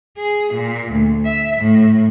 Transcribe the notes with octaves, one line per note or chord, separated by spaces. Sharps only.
G#4
A#2
D2
E5
A2